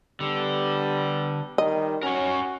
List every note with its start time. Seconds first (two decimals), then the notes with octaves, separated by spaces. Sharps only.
0.20 D3 G3 B3
1.58 D#3 G3 D#5
2.03 C#4 F#4 A#4 C#5